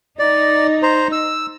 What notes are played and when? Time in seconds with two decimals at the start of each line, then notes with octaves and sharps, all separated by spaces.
0.19 D#4 D5
0.83 C5 A#5
1.12 E6